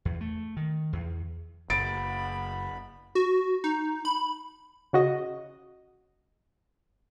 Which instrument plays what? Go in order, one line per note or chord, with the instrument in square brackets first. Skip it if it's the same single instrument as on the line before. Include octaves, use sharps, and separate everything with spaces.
[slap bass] E2
A3
D#3
E2
[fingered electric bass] F#1 [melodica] B3 B5 [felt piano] A6 D7
[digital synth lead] F#4
D#4
B5
[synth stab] C#3 F#4 D#5